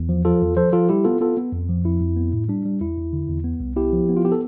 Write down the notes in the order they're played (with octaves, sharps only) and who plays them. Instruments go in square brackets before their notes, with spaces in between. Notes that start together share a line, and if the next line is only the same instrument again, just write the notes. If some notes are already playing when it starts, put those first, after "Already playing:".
Already playing: [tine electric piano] E2
F3
F3 F4 A4
E2
F3 A4 C5
F3 F4 A4
G3 E4 G4
B3 F4 A4
B3 F4 A4
B3
F2
F3
F2 E4
F2
B3
A2
G3 D4
G3
E2 E4
E2
D3
E2
B3
C2
B3 E4 G4
F3
B3
F4
B3 G4
A4